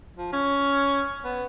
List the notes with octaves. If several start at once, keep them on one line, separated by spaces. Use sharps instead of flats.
F3
C#4
B3